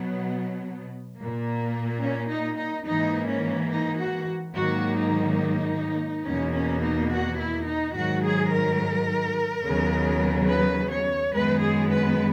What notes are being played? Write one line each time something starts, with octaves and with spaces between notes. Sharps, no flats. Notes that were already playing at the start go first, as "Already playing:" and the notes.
Already playing: B2 F#3 B3
A#2 A#3
C#4
D#4
D#4
G#2 E3 A#3 D#4
C#4
D#4
F#4
G#2 D#3 F#3 A#3 F#4
D#4
E2 B2 A#3 C#4
C#4
D#4
F#4
E4
D#4
G#2 D#3 F#3 F#4
G#4
A#4
D#2 C#3 F#3 B3
B4
C#5
F#2 D#3 G#3 B3 B4
G#4
B4